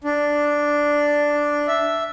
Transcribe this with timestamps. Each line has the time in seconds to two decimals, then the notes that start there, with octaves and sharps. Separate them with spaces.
0.04 D4
1.68 E5